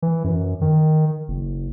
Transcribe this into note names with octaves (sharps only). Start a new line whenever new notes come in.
E3
F#2
D#3
F#1